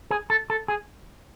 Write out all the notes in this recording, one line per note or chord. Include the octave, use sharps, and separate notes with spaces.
G#4
A4
A4
G#4